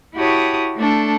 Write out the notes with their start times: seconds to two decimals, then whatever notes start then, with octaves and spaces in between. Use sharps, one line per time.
0.16 E4 F#4 G4 C#5 A5 D#6
0.77 A3 D4 A4